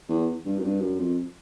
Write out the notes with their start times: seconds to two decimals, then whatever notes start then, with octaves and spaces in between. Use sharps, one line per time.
0.09 E2
0.45 G2
0.58 F#2
0.64 G2
0.81 F#2
0.99 F2